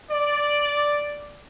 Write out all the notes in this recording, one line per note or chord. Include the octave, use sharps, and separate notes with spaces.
D5